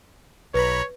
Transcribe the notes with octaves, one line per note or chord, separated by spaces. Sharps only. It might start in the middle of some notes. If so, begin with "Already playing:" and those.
B1 B4 C#5 A#5 B5